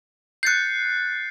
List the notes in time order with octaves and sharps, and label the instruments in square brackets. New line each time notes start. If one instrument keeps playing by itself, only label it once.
[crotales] F#6 A6 C7 [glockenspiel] G6 C#7